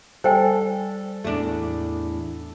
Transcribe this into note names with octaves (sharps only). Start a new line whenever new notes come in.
G3 A4 C5 G5 G#5
E2 A2 A3 D4